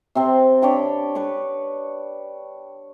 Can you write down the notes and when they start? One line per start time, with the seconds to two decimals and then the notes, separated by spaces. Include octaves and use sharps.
0.15 C3 C4
0.62 D4 C#5 G5 B5
1.15 B4 B5 C#6